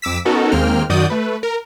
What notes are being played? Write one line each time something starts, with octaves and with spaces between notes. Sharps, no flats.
F2 D6 E6 B6
B3 C#4 D#4 F#4 A4 A#4
D#2 G#3 A#3 C4 G5 F6
F#2 D#3 F#4 D5 D#6 G6
A3 B4
A#4